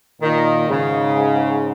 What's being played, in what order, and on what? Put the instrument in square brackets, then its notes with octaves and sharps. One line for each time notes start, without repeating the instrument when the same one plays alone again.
[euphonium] A#2 [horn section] D#3
[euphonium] G#2 [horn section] C#3